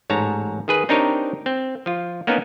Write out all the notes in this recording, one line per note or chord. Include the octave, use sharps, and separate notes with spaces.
A1 G#2 C#5 A5 A#5
D#3 G#4 B4
C4 D4 D#4 G4 A#4 C#5
C4
F3 F4
A#3 B3 C#4 D#4 A#4 B4